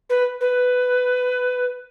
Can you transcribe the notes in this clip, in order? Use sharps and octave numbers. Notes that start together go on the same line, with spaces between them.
B4
B4